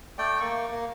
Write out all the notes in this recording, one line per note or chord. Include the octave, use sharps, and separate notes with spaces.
A3 D5 G5
A#3 C#6
A#3